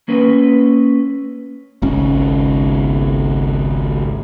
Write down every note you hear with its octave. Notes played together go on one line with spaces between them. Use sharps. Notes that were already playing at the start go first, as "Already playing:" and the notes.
A#3 C#4 B4
G#1 C#2 C#4